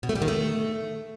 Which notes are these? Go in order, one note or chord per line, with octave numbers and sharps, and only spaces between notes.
B2
A3
G3
D#3
A3